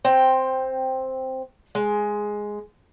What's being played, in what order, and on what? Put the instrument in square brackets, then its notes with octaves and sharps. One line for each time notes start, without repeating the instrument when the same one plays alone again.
[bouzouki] C4 G5
G#3